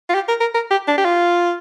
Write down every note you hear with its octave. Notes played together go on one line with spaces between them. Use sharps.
F4
G4
A#4
A#4
A#4
G4
D4
G4
F4